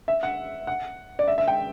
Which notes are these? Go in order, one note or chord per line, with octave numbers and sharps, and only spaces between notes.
E5
F#5
F#5
D5
E5
E5
G5